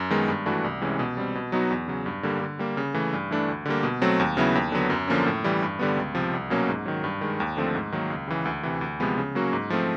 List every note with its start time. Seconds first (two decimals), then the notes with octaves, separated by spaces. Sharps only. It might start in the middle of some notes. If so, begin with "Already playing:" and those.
Already playing: F#2
0.11 D#3 G#3 B3
0.28 G2
0.46 E3 A3 D4 F#4
0.64 C2
0.81 C3 E3 G#3 C#4
0.99 B2
1.17 G3 C4
1.35 B2
1.52 F#3 B3 D#4 F#4
1.70 E2
1.88 C#3 F#3
2.06 G2
2.23 D3 G3 A#3
2.41 D3
2.59 G3 A#3
2.77 C#3
2.94 E3 A3
3.13 G2
3.31 E3 A3 D4
3.48 D2
3.65 D3 G3 A#3
3.83 B2
4.02 F#3 A3 C4
4.20 D#2
4.37 C#3 F#3 B3 E4
4.55 D#2
4.72 D3 F#3 B3
4.90 F#2
5.08 D3 F3 A#3 C#4
5.26 A2
5.44 E3 G3
5.62 G2
5.79 D3 G3 B3
5.96 C#2
6.15 C3 F3
6.33 C2
6.50 B2 F#3 A#3 C#4
6.69 G#2
6.86 D#3 F#3
7.04 G2
7.21 D#3 G#3
7.40 D#2
7.57 D3 F3 A3 C4
7.75 G#2
7.92 D#3 F#3 A#3
8.10 C#2
8.28 C#3 E3
8.45 D2
8.63 C3 E3
8.81 D2
9.00 C3 F3 G#3 B3
9.18 C#3
9.35 F#3 A#3 C#4 F#4
9.53 G#2
9.70 F3 A3 C4